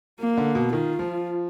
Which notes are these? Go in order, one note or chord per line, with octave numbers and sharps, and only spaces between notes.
A#3
D3
B2
D#3 F4
F3